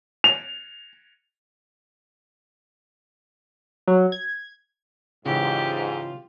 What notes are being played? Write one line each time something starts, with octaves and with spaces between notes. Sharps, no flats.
F7
F#3
G#6
G#2 C#3 E3 F4 G4